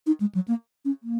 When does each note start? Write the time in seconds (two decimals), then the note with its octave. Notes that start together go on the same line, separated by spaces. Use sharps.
0.07 D#4
0.20 G#3
0.35 F#3
0.48 A#3
0.85 C#4
1.03 A#3